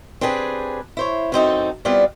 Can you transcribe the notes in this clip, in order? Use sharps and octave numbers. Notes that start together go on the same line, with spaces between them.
C4 D4 G4 G#4 B4
E4 C5 C#5
F#2 C4 D#4 A4
G3 B3 C4 E4 F4 D5